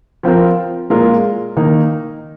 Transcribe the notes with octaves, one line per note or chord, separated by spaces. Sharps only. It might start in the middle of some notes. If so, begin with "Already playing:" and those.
F3 C4 F4 A#4
A#2 G#3 F4 A#4
D#3 A#3 D#4 A#4